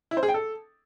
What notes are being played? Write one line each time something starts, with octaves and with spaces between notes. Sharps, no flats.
E4
C5
G#4
G5
A4